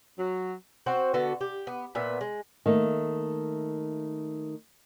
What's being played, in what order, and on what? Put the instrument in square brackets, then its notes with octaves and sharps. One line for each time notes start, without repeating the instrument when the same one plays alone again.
[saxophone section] F#3
[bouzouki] C4 F#4 C5
D3 B3 F#4 A4
G4
B3
A#2 B3 E5
G#3
[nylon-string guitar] D#3 A3 A#3